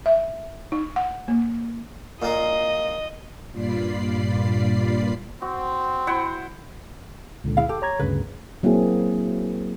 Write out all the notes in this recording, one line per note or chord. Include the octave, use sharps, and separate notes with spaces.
E5
D#4
F#5
A#3
A#2 A#3 D#5
G2 A#2 F4 D5 B5 C7
C4 F#4
E4 C5 F#5
C#2 A#2 D3
E4 G#4 F5
G4 A4
C#5 A#5 G#6
D2 G2 C#3 B4
F#3 A#3 C4 E4 G#4